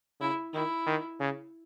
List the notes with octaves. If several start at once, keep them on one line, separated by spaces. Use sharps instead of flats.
C#3 E4
D#3 E4
D#3
C#3